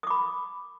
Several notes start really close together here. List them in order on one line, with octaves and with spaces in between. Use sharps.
D#6 D6 B5